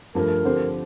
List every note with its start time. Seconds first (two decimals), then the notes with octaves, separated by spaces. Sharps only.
0.15 G2 F3 A3 A#4
0.45 D3 F3 C4 G4 C5